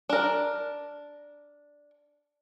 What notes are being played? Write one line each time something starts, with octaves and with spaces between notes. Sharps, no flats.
D4 A#4